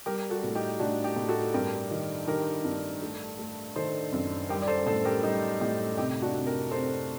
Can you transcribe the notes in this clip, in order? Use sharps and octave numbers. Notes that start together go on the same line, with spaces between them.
G3 G4 A#4
F#4 A4
A2
D#4 G4
A2 D4 F#4
D#4 G4
A2
F#4 A4
G2 G4 A#4
D#3
D#3 G4 A#4
G2
A3
A3
D#3 A4 C5
F#2
G3 G4 A#4
D5
A4 C5
A2 A4 C5
G4 A#4
G3 D#4 G4
A2 D#4 G4
C3 D#4 G4
D4 F#4
C3
G4 A#4
C3 A4 C5